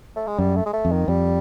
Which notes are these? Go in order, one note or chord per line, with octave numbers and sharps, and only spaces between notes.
A3
G#3
F#2 G3
A3
G#3
A3
F2
D#3
F2 G3